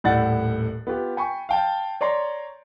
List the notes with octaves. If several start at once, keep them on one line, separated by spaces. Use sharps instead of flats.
D#1 A2 E4 D5 F#5 A6
B3 F4 G4
G5 G#5 B5 C#6
F5 G5 A5
C#5 D5 A#5 C6